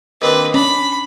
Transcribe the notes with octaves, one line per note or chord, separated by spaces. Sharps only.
D#2 C4 D4 B4
C#4 D4 B5